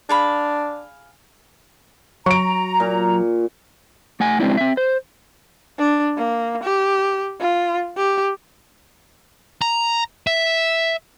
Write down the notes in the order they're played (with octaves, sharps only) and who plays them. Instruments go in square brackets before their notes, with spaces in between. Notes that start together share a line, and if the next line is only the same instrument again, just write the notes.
[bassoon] D4 [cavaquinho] G#4 F5 B5
[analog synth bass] F#3 [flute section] A#5 [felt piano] C#6 D7
[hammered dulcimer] A#2
[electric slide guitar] A3 F#5 G#5
G#3 C4 D4 E4
C4 E5
C5
[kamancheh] D4
A#3
G4
F4
G4
[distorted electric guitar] A#5
E5